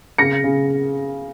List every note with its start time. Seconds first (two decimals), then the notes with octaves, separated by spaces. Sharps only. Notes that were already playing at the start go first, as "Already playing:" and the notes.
0.18 C#3 A#6 C#7
0.44 C#3